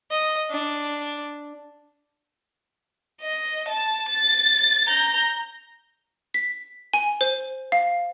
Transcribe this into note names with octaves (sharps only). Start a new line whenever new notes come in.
D#5
D4
D#5
A5
A6
A#5 G6
B6
G#5
C5
F5